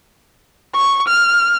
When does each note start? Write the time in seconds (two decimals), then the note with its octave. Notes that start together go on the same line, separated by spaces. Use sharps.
0.75 C#6
1.08 F6